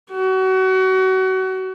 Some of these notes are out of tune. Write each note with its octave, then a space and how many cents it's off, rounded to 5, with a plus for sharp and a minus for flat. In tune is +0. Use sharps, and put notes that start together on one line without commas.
F#4 +30